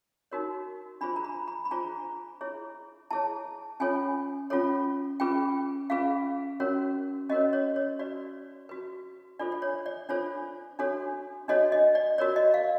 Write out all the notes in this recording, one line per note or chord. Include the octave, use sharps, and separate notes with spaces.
D#4 F#4 A#4 C#5
D4 F4 G#4 C5 B5
A#5
B5
B5
B5
D4 F4 G#4 C5 A#5
E4 G#4 C#5
E4 G#4 C#5 A5
C#4 F4 A4 C#5 G#5
C#4 F4 A4 C#5
C#4 F4 G#4 B4 G5
C#4 F4 G#4 B4 F5
C#4 F#4 A#4 C#5
C#4 F#4 A#4 C#5 D#5
C#5
C#5
F#4 B4 D5
F#4 B4
D4 F4 A4 C5 D5
D5
C#5
D5
D4 F4 A4 C5 C#5
D4 F#4 A4 C#5
D4 F#4 A4 C#5 D#5
D#5
D5
F#4 A#4 C#5 D5
D#5
F5